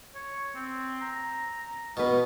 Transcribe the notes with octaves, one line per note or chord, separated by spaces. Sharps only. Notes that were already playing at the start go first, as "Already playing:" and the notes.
C#5
C4
A#5
B2 B3 B4 F5